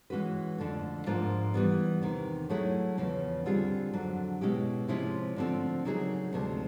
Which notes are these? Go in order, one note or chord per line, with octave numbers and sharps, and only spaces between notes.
E3 G#3 C#4 F#4 B4
F2 D3 F3 A3
G#2 F3 A#3 D4 F4
E3 G3 B3
E2 C3 D#3
F#3 A3 C#4 E4 G#4
E2 C#3 F3
D3 G3 C4 F4 G#4
F2 D3 F#3
B2 G#3 C#4 E4 G4
C3 F3 G#3 C#4 E4
D3 F3 A3 C4
C#3 F#3 A#3 D#4 G#4
D2 C3 F3 G#3